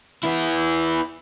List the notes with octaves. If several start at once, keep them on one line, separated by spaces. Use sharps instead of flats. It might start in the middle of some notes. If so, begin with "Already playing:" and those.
B3 E4